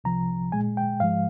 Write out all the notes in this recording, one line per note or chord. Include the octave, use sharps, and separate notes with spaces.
C2 C3 F3 A#5
A#2 G#3 G#5
G5
G#2 F3 G#3 F5